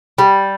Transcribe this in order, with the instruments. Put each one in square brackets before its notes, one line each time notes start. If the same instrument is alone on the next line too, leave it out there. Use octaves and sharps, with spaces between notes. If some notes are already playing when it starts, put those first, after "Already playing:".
[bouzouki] G3